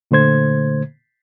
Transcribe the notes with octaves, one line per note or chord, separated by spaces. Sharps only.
A#2 D3 A3 C5 G#6